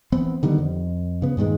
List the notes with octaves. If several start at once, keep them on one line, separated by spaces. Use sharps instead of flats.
E3 B3 C4
D3 D#3 G3 B3
F2
C#3 B3
G2 A#2 D#3 G#3